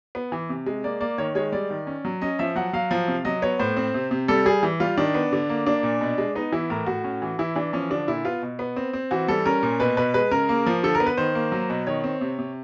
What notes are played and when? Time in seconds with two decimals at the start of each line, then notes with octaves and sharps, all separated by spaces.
0.15 B3
0.32 E3
0.49 C3
0.66 G#3
0.84 A#3 D5
1.00 A#3 D5
1.18 D#3 C#5
1.35 G#3 C#5
1.52 G3 D5
1.71 D#3
1.87 C#4
2.05 F#3
2.22 C#4 D#5
2.39 F3 E5
2.56 F#3 F#5
2.73 F#3 F5
2.91 F3
3.08 C3
3.25 F#3 D#5
3.42 B3 C#5
3.59 A2 C5
3.77 C4
3.94 C3
4.11 C3
4.28 G3 A4
4.45 G3 G#4
4.63 E3
4.80 G3 F4
4.97 D#3 D4
5.15 B3
5.33 D3
5.50 A#3
5.67 A#3 D4
5.83 A#2
6.01 B2
6.18 G#3
6.36 B3 D#4
6.52 E3 E4
6.70 A2 A#4
6.86 A2 F#4
7.04 C#4
7.22 E3
7.39 E3 E4
7.55 E3 D4
7.73 F3 C#4
7.90 D3 D4
8.07 A#2 E4
8.25 B3 F4
8.43 B2
8.59 B3
8.76 C4
8.93 C4
9.11 E3 F#4
9.28 G3 A4
9.46 C#4 A#4
9.63 A#2
9.80 B2 B4
9.97 B2 B4
10.14 G#3 B4
10.31 C#3 A#4
10.49 A#3
10.66 F3
10.83 D3 A4
10.95 A#4
11.00 B3
11.06 B4
11.17 D#3 C5
11.35 A#3
11.52 F#3
11.70 B2
11.87 D#3 C#5
12.04 C4
12.21 C3
12.39 C3